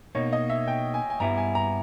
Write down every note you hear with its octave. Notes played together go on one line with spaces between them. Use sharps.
B2 A#3 D#4 C#5
D#5
E5
G5
G#5
G#5
G2 G3 B3 E4 A#5
G#5
A#5